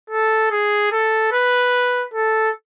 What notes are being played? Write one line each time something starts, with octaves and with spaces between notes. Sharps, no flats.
A4
G#4
A4
B4
A4